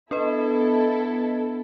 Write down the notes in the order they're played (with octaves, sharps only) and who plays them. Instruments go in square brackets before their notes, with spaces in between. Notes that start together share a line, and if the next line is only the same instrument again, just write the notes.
[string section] B3 E4 A4 [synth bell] D4 B4 D#5